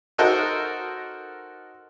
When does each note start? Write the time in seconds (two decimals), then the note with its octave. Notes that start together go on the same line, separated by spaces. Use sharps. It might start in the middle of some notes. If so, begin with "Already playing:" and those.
0.18 D#4 F#4 A4 A#4 C5 D#5